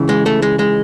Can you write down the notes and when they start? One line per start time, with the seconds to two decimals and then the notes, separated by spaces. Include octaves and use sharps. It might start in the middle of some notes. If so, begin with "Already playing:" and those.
Already playing: C#2 C#3 E3
0.09 G#3
0.26 A3
0.42 G#3
0.59 G#3